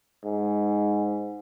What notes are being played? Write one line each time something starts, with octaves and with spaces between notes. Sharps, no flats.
G#2